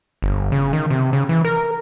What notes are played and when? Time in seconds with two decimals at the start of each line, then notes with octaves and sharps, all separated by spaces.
0.22 G1
0.52 C#3
0.73 D#3
0.90 C3
1.13 C#3
1.29 E3
1.45 A#4